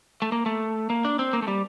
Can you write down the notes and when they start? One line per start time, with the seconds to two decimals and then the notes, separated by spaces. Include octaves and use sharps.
0.22 A3
0.32 A#3
0.46 A3
0.90 A#3
1.05 D4
1.19 C4
1.33 A#3
1.42 A3
1.48 G3